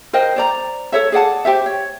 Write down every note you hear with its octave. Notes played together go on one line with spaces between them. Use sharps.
A#4 C5 D#5 G5
C5 D5 A#5
A4 C#5 E5
G#4 D5 F#5 A5
G4 C5 E5
C#5